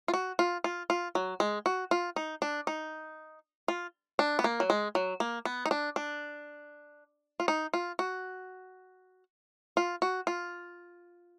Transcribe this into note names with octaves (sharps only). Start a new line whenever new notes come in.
F4
F#4
F4
F4
F4
F#3
G#3
F#4
F4
D#4
D4
D#4
F4
D4
B3
A#3
F#3
G#3
F#3
A#3
B3
D#4
D4
D4
F4
D#4
F4
F#4
F4
F#4
F4